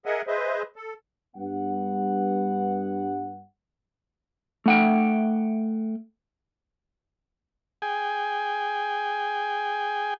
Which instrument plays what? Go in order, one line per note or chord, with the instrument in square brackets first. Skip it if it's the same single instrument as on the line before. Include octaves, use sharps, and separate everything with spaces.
[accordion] G#4 A#4 D#5 E5 F#5 G#5
G#4 B4 C5 D#5 E5
A4
[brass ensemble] G2 B3 F#5
[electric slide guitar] A3 F#5 G5
[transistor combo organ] G#4 G5 G#5